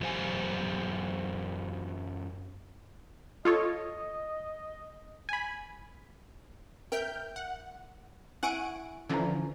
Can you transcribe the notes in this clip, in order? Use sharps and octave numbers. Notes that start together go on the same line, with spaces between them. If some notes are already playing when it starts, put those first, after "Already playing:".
F#2 E3 G4 C5 F5 G#5
F4 A4 C#5 D#5
G#5 B5
A#4 E5 G5 F6 G6
F#5
E4 F#5 G#5 C#6 D7
D3 E3 F3 C#4 A#5